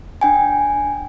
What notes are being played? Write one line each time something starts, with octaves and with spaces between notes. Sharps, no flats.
D4 G5 G#5